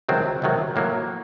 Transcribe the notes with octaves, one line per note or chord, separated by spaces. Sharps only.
C#2 C3 D#3 F#3 C4
C#2 C3 D#3 F#3
A2 F#3 A#3